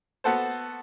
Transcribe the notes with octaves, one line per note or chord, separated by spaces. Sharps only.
B3 F#4 A4 C5